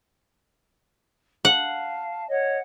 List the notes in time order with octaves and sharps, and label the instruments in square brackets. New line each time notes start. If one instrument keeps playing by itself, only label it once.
[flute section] F5 A5 [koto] F#5
[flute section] C#5 D#5 F#5